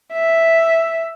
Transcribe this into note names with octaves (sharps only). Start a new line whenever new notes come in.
E5